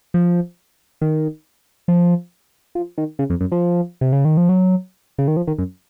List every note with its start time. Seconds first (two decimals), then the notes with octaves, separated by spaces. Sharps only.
0.14 F3
1.01 D#3
1.88 F3
2.75 F3
2.98 D#3
3.19 C#3
3.30 F2
3.40 F#2
3.52 F3
4.01 C3
4.13 C#3
4.25 D#3
4.37 F3
4.49 F#3
5.18 C#3
5.28 D#3
5.37 F3
5.47 D#3
5.58 F#2